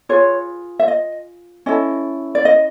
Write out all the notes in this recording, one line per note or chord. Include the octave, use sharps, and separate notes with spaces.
F4 G#4 B4 C#5
E5
D#5
C#4 E4 A4 D#5
D5
D#5